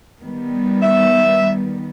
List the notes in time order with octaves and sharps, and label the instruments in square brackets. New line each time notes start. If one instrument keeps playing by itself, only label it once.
[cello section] D#3 G3 B3
[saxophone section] E5